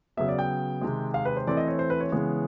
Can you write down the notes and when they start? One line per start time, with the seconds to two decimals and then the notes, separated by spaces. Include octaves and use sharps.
0.17 C#3 F#3 B3 E5
0.28 D5
0.39 G5
0.81 C3 D#3 G#3
1.14 F5
1.25 B4
1.37 C5
1.47 E3 A3 C4 D5
1.57 D#5
1.68 C#5
1.79 C5
1.90 B4
2.00 C#5
2.12 C#3 E3 G#3 B3